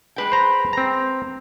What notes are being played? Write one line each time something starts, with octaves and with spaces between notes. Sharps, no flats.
G#3 B4 G5
C5 A#5
C4 A#5